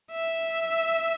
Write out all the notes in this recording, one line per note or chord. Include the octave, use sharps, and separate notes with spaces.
E5